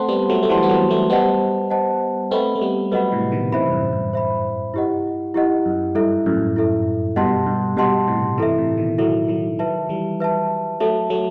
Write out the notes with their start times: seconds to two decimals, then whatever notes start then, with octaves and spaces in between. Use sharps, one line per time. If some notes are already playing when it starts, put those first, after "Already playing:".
Already playing: A3 C4 C5 F#5 A5 C6
0.09 G3 B3
0.30 F#3 A3
0.43 A3
0.49 E3 G3 C5 F#5 A5 C6
0.63 B3
0.69 F#3 A3
0.90 F#3 A3
1.10 G3 B3 C5 D#5 F#5 A5
1.70 C5 D#5 F#5 A5
2.31 A3 C4 B4 D#5 F#5 B5
2.55 A3
2.61 G3 B3
2.92 F#3 A3 B4 D#5 F#5 B5
3.12 A2 C3
3.32 B2 D#3
3.52 C3 E3 C5 E5 B5
3.68 G2
3.72 F#2 A2
3.93 G2
4.13 C5 E5 B5
4.74 E4 G4 D#5 F#5
5.34 E4 G4 D#5 F#5
5.66 F#2
5.95 G2 E4 A4 E5
6.26 F#2 A2
6.56 E4 A4 E5
7.16 G2 B2 G4 D#5 F#5 A5 C6
7.46 G2
7.77 G2 B2 G4 D#5 F#5 A5 C6
8.08 A2 C3
8.38 C3 E3 E4 A4 E5
8.58 A2 C3
8.78 B2 D#3
8.98 D#3 F#3 E4 A4 E5
9.28 D#3 F#3
9.59 D#3 F#3 B4 E5 A5
9.89 E3 G3
10.20 B4 E5 A5
10.80 F#3 A3 A4 E5 A5
11.10 F#3 A3